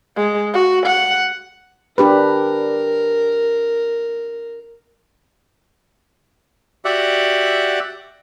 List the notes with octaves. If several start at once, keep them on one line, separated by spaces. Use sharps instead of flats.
G#3
F#4
F#5
D4 G4 A#4 B4
F#4 G4 D5 E5 F#5